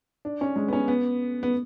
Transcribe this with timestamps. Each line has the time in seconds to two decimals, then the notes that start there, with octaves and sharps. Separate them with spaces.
0.25 D4
0.41 C#4
0.56 G#3
0.68 B3
0.73 C#4
0.88 B3
1.43 B3